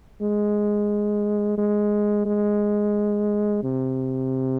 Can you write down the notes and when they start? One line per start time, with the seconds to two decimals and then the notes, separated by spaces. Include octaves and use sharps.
0.22 G#3
1.58 G#3
2.25 G#3
3.63 C3